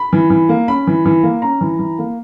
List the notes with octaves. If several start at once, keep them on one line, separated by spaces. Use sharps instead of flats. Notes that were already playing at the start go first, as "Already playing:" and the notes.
Already playing: B5
E3
E3
A#3
C#4 B5
E3
E3
A#3
C#4 A#5
E3
E3
A#3